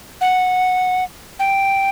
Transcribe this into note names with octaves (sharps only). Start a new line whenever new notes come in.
F#5
G5